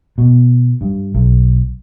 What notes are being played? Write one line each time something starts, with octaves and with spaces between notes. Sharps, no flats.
B2
G2
B1